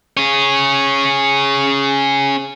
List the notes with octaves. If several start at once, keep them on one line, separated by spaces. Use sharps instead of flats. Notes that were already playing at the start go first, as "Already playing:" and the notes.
C#4 G#4